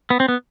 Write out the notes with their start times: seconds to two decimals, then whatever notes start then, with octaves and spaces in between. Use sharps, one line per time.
0.10 B3
0.20 C4
0.28 B3